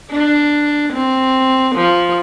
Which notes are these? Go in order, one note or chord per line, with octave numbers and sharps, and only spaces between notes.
D4
C4
F3